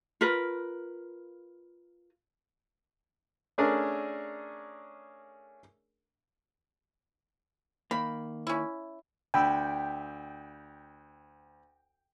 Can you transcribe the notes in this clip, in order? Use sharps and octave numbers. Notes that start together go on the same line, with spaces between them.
F4 A#4 B4
A3 C#4 D4 G#4 A#4 D5
D#3 A#3 B5
C#4 E4
D2 G5 B5 E6